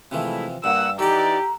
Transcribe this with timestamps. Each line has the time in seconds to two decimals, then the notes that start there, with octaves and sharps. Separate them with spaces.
0.11 C3 E3 F3 G#3 A3 E4
0.64 G2 A#3 F#5 E6
0.99 E3 D#4 G4 A4 D5 F#5 A#5